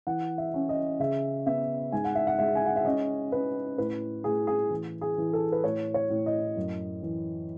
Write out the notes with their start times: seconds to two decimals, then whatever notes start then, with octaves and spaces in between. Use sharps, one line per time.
0.07 E3 F#5
0.38 E5
0.54 C#4
0.69 D#5
0.99 C#3 E5
1.47 B3 E5
1.92 G#2 G#5
2.04 F#5
2.15 E5
2.27 F#5
2.39 G#3 E5
2.55 G#5
2.66 F#5
2.76 E5
2.85 C#4 D#5
3.32 C#4 B4
3.78 A2 B4
4.24 A2 G#4
4.47 G#4
4.70 E3
5.01 G#4
5.18 E3
5.33 A4
5.52 B4
5.64 A2 C#5
5.94 C#5
6.10 A2
6.26 D#5
6.57 F#2
7.02 E3